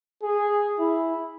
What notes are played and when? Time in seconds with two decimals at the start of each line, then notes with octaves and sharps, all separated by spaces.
0.23 G#4
0.80 E4